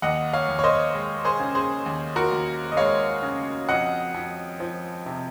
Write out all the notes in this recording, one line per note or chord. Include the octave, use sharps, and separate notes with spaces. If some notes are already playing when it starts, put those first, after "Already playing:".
D#2 D#5 F#5
C#5 F5
D#2
C#5
C5 D#5
G#3
G#4 C5
C#3
G#4 C5
D#2
F#4 A#4
D#2
D#5
G#3 C#5 F5
C#3
F2 D#5 F#5
F2
F3
C3